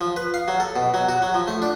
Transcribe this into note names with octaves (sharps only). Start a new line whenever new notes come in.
F3
B4
F5
F#3
A4
B2
F#3
F#4
F#3
F3
A3
D4